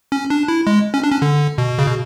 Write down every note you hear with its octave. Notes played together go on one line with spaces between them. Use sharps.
C#4
D4
E4
G#3
C#4
D4
C#4
D3
B2
C#3
B2